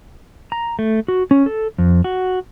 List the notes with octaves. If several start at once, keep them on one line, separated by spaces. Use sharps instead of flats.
A#5
A3
F#4
C#4
A4
F2
F#4